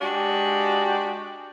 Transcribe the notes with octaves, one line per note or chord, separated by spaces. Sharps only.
G#3 D4 F#4 G4